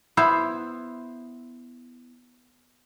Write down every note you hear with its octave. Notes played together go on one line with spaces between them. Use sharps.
B3 E4 C5